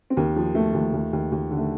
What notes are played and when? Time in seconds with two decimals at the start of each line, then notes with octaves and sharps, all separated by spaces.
0.10 C4
0.17 D#2 A#3
0.37 F3
0.55 F3 A3
0.74 D#2
0.93 D#2
1.13 D#2
1.32 D#2
1.51 D3
1.58 A3